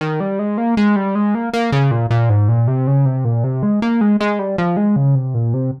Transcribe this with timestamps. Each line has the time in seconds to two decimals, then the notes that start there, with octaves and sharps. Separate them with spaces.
0.01 D#3
0.20 G3
0.39 G#3
0.58 A#3
0.77 G#3
0.96 G3
1.15 G#3
1.35 A#3
1.53 A#3
1.72 C#3
1.91 A#2
2.10 A#2
2.30 G#2
2.49 A#2
2.68 C3
2.87 C#3
3.06 C3
3.25 A#2
3.44 C3
3.63 G#3
3.82 A#3
4.01 G#3
4.20 G#3
4.39 G3
4.58 F3
4.77 G#3
4.96 C#3
5.15 C3
5.34 A#2
5.54 C3